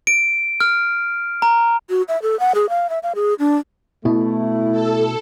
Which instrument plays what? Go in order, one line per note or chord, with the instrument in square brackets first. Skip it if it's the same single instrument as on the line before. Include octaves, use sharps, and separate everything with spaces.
[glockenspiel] D7
F6
A#5
[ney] F#4
E5
A4
F#5
G#4
F5
E5
F5
G#4
D4
[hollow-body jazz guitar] B2 [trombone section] A3 [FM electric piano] E4
[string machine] A4